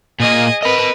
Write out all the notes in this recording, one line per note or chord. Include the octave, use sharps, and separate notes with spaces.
A#2 A#3 G#4 D#5
A#4 B4 D#5 B5